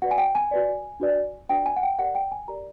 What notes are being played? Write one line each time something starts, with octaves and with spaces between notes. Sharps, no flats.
F#4 B4 D5 F#5
G#5
G5
G#5
F#4 B4 D5
D4 F#4 B4 D5
D4 F#4 B4 D5 G5
G#5
F#5
G5
G4 A#4 D5 F#5
G5
G#5
G4 A#4 D5 A#5